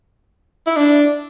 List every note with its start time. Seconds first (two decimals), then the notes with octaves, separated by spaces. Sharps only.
0.67 E4
0.76 D4